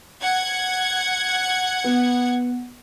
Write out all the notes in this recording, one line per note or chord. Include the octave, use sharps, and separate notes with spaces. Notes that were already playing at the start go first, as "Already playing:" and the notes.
F#5 G#6
B3